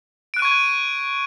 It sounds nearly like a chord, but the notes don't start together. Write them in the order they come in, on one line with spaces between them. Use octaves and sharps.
D7 F#6 D#7 C#6 G#6